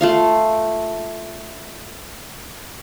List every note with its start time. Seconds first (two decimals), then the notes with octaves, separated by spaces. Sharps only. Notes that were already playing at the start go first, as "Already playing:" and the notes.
0.01 A3 F4 F5